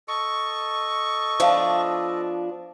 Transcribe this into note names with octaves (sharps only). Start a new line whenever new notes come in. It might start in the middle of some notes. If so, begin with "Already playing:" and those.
A4 D#5 C#6
F3 B3 D4 E5 F5 A5